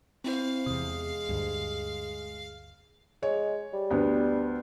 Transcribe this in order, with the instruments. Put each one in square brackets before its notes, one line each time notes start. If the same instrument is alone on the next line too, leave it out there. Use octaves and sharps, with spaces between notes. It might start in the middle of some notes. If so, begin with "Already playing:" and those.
[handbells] C4 E4 C5 [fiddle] F5
[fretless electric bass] E2 C3 [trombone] G#3 [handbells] D#6
[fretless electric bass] D2 G2
[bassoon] G#3 [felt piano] C#5
[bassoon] G3
[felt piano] D2 B3